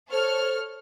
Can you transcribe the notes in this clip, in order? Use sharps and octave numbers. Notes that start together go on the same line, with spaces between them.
A4 C5 C#5 F6